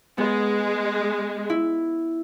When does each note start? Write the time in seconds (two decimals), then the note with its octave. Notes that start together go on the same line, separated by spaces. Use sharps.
0.18 G#3 B3
1.50 E4